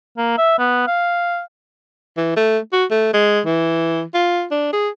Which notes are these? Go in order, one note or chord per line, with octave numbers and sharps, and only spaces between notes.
A#3
E5
B3
F5
E3
A3
F#4
A3
G#3
E3
F4
D4
G#4